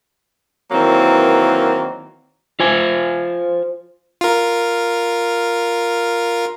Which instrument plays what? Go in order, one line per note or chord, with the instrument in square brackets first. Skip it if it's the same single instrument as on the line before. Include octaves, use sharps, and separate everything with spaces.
[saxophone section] D#3 E3 F#3 A#3 C4
[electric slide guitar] F4 C5 G#5
[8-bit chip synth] F4 A#4